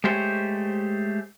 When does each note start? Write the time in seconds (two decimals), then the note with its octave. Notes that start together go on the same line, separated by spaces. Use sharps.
0.04 G#3 A3 G4 C5 C#5